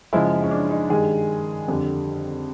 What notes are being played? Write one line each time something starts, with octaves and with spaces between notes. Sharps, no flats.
F#2 C#3 F3 G#3 E4
C#4
D4
D#4
G2 D#3 G#3 G#4
F2 D3 G3